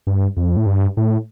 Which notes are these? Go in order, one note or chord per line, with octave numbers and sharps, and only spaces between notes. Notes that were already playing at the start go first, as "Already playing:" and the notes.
G2
F2
A2
G2
A2